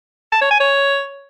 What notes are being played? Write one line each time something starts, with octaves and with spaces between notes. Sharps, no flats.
A5
C#5
G#5
C#5